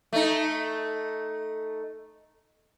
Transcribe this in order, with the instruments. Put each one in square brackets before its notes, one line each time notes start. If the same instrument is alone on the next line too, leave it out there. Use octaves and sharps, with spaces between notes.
[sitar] A3 D#4